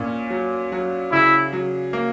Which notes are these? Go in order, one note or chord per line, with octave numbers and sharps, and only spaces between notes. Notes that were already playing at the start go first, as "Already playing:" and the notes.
Already playing: A#2 C#4
F#3
F#3
C#3 E4
F#3
A#3